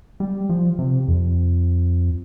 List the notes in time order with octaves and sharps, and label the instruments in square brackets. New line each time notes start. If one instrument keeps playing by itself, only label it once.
[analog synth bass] G3
F3
C3
F2